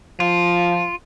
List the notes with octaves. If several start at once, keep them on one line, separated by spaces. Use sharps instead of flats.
F3 F4